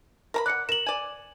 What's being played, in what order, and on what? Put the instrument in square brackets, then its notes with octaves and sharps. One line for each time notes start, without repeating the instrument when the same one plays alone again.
[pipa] A#4 A#5 B5
[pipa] D5 F#5 [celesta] F#6 C#7
[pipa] A#4 [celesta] E7 F#7
[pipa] D5 G#5